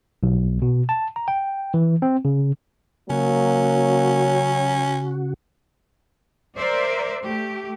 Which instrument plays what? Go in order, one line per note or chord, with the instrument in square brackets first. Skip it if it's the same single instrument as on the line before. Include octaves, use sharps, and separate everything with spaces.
[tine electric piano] B1
B2
A5
A#5
G5
E3
C4
C#3
[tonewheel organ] C#3 F#4 [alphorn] F#3 [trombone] A#3 [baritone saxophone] C#4
[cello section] A#4 C5 D5 E5
A3 G4